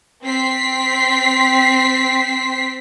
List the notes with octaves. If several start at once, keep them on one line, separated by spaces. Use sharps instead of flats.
C4 B6 C7